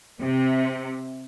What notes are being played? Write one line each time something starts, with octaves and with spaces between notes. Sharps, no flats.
C3